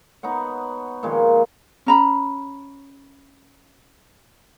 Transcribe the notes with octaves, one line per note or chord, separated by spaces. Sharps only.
B3 D#4 C#5 F#5
A#2 D#3 F3 G#3
C#4 A#5 B5